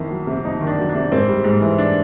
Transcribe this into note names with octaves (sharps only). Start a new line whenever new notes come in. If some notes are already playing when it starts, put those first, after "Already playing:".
Already playing: F2 D#3 E4
F#3
C3
F2 D#4
D#3
D4
F#3
D4
C3
G#2 C4
G3
G#2
E3
D4